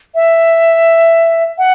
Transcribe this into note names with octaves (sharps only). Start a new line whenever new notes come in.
E5
F#5